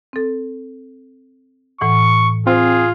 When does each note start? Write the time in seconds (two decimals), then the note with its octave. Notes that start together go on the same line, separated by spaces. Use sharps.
0.13 C4 A4
1.81 A2 E3 F#5 C#6
2.47 C4 F4 G#4